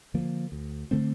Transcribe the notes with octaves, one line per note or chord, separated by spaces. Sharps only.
D3 F3 A#3
D2
D3 A3 C4